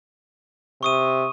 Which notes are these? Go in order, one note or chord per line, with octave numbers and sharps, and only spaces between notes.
C3 C#6 D#6 D#7